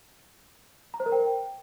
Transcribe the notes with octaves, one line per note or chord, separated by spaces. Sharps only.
A#5
C5
A#4
G5